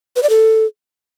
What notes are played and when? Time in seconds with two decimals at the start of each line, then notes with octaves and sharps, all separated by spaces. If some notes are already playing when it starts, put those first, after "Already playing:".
0.16 B4
0.23 D5
0.30 A4